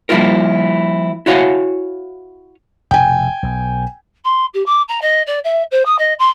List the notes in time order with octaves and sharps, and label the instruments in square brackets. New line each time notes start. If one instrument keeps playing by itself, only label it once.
[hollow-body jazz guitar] F3 G3 A#3 E4 F4 A#4
E4 F#4 C#5 F5 G#5
[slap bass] F1 B2 [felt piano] G5 G#5
[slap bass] B1
[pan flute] C6
G4
D6
A#5
D#5
D5
E5
C5
D#6
D#5
C6